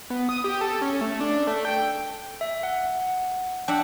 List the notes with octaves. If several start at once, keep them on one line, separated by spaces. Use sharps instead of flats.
B3
D#6
G4
A4
C#4
A3
D4
A3
G5
E5
F#5
D4 E5 F#5 G5